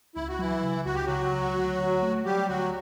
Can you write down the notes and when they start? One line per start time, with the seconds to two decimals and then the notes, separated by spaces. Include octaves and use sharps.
0.15 C#2 E4
0.29 F#4
0.39 E3 F#3 E4
0.63 C#3
0.85 C#2 F#4
0.95 G4
1.06 C#3 F#3 F#4
1.32 C#2
1.56 D2
1.79 D2
2.02 A3
2.25 F#3 G3 G4
2.49 D2 F#3 F#4